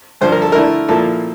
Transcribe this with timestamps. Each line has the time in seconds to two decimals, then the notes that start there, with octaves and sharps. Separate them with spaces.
0.21 G2 D3 F3 C5
0.32 A#4
0.42 A4
0.52 D3 A3 E4 A#4
0.89 A#2 F3 A#3 E4 A4